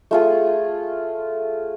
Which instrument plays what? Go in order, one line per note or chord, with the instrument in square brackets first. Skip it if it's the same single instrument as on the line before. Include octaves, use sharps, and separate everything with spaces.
[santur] A3 F4 G#4